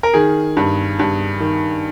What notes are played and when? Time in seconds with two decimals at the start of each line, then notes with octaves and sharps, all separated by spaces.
0.03 A#4
0.14 D#3 G#4
0.57 G2
0.99 G2
1.40 D#3